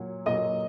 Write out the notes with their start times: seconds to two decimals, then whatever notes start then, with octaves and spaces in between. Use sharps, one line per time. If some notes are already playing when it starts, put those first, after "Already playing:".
Already playing: A#2 F#3 C#5
0.26 A#2 F#3 D#5 D#6